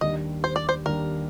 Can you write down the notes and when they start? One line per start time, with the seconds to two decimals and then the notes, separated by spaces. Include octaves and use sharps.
0.01 D#2 D#3 G3 D4 D#5
0.44 C5
0.56 D5
0.69 C5
0.86 D#2 D#3 G3 D4 A#4